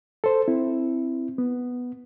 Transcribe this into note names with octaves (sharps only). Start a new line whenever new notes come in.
A4 C5
C4 E4
B3